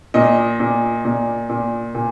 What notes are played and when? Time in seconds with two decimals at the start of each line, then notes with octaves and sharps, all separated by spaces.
0.14 A#2 D#5
0.60 A#2
1.05 A#2
1.50 A#2
1.95 A#2